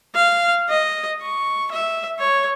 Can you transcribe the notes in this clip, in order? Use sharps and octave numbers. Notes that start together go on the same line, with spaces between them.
F5
D#5
C#6
E5
C#5